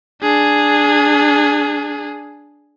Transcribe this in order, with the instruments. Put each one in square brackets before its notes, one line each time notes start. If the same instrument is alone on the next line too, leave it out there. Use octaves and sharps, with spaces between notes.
[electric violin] D4 G#4